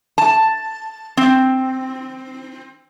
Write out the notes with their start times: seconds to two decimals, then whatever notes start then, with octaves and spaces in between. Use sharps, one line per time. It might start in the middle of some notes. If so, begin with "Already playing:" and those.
0.18 A5
1.17 C4